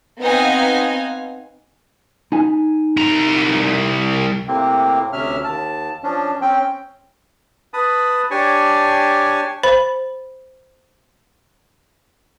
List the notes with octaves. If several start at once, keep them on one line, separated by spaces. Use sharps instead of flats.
B3 C4 D#4 F5 F#5 G#5
D#4 G#5
C2 A#5
A2 C3 A#3 C4
D2 C3 C#4 E5 F6
D#2 A5
F3 C#4 D4
C4 C#4 G5
B4 A5 B5 D#6
D4 G4 C#5 G#5 A5
C5 B5